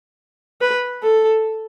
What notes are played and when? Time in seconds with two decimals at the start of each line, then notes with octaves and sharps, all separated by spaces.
0.61 B4
1.03 A4